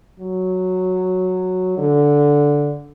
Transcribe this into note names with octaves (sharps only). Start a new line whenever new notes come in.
F#3
D3